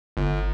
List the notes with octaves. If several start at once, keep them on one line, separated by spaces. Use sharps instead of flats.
G1